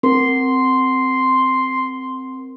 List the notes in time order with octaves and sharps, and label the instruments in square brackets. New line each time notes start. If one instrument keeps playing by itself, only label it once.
[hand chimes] C4 A#4 [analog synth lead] C6